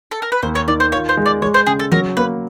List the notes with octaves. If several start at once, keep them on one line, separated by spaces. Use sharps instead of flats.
A4
A#4
B4
D#2 C5
C#5
D#3 D5
C5
F4 C#5
C5
G#3
D5
G#3 C#5
C5
C#3 G#4
A4
F#3 A#4
A#3 B4